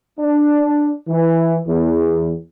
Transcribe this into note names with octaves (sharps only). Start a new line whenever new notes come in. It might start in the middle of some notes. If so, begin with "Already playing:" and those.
D4
E3
E2